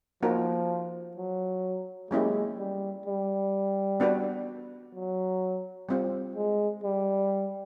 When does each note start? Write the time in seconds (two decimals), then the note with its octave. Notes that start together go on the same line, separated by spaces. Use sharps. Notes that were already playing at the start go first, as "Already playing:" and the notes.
0.22 F3 A#3 D#4 F#4 A#4
1.17 F#3
2.11 F#3 G#3 A#3 C#4 E4 G4
2.58 G3
3.06 G3
4.00 B3 D4 F#4 B4
4.95 F#3
5.89 G3 C4 F4
6.36 G#3
6.83 G3